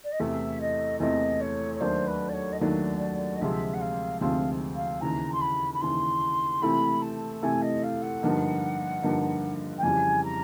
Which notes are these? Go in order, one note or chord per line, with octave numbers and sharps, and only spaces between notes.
D5
D#5
E2 C3 E3 A3 C4 E5
D#5
E2 C3 E3 A3 C4 D#5
C#5
C#5
D#2 D#3 F#3 A3 D4 C5
B4
D5
C#5
D#5
D#2 D#3 F#3 A3 D4 D5
D#5
D2 C3 F3 G#3 C4 E5
F#5
F5
D2 C3 F3 G#3 C4 F5
F5
D#2 C#3 E3 A#5
C6
B5
B5
D#2 C#3 E3 C6
C3 E3 A3 C4 E4 B5
A5
C3 E3 A3 C4 E4 G#5
D#5
F5
F#5
G2 D3 F3 A#3 D#4
G2 D3 F3 A#3 D#4
G5
F2 C#3 E3 G3 G#5
A#5